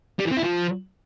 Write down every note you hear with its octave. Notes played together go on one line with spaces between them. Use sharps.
G3
E3
C4
E4
F3